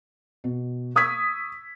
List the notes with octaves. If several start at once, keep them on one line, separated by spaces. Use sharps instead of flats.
B2
C#6 D#6 E6 G#6 B6